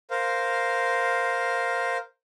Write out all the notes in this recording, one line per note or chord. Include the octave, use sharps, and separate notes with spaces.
A#4 C5 F5